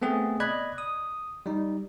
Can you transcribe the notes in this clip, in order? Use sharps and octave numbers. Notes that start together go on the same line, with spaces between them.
A3 B3 C4 G#4
D5 D#5 B5 F#6 G#6
D#6
G3 D#4